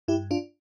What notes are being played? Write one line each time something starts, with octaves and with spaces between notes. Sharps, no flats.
G2 E4 G4
D4 F4